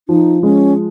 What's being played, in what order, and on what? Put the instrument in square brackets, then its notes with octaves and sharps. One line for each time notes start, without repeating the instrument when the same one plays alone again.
[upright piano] F3 [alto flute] D#4
[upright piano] G#3 [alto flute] C#4